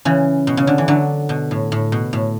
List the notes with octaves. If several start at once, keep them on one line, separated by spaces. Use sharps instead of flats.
C#3 E3
B2
C#3
D3
E3
D3 F#3
B2
A2
A2
B2
A2